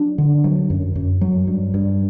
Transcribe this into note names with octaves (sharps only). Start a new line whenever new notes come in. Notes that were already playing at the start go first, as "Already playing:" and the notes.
Already playing: F#3 D4
D3
F#3
F#2
F#2
F#3
G2
G2